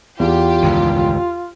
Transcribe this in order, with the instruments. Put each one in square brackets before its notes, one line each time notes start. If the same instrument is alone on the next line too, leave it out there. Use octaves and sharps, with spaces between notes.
[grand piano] E2 [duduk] F4 [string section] G4
[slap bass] C#2 G2 D#3